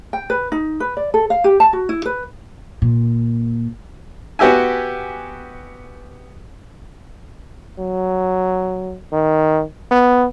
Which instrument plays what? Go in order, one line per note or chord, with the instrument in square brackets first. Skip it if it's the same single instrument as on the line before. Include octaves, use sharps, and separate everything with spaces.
[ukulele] G5
B4
D#4
B4
D5
A4
F5
G4
A5
F#4
E4
B4
[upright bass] A#2
[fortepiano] B3 F#4 G4 E5 G#5
[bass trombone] F#3
D#3
B3